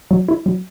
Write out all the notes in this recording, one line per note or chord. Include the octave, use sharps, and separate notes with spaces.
F#3
E4
F#3